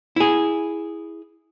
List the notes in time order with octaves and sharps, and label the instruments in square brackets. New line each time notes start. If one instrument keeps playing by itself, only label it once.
[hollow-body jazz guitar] E4 G#4